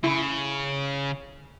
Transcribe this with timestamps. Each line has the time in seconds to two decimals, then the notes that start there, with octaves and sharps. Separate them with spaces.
0.04 C#3 E4